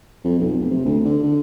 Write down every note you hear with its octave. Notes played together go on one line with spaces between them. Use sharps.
F2
B1
F1
C3
D2
D3
D3